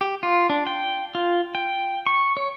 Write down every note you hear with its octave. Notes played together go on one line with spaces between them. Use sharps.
G4
F4
D4
G5
F4
G5
C#6
C#5